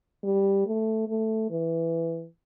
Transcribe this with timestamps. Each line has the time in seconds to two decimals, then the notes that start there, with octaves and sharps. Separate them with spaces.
0.24 G3
0.66 A3
1.08 A3
1.50 E3